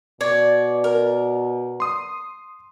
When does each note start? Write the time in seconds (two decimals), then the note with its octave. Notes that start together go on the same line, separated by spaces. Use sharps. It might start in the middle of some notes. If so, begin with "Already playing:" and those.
0.21 B2 C#5 D5
0.84 A#4
1.80 C6 D#6